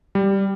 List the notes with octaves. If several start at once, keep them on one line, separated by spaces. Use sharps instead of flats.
G3